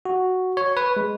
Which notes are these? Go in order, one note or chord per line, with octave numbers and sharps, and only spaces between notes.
F#4
C#5
B4
G#3